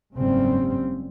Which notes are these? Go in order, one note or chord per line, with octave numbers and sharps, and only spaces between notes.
F#1 G#2 C#3 G3 C4